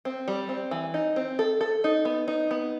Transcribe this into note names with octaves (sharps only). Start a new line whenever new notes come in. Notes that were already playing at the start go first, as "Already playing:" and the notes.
C4
G3
C4
E3
D#4
C4
A4
A4
D#4
B3
D#4
B3